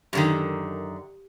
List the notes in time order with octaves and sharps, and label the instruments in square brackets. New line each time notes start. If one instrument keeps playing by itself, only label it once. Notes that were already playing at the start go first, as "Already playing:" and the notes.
[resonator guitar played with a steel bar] F#2 D3 D#3 [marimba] G4